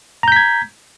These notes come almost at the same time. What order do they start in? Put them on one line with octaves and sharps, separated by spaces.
A#5 G6 B6 G#6